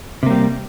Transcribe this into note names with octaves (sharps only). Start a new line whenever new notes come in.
C3 G3 A#3